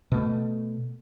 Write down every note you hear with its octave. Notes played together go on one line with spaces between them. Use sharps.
B2 A3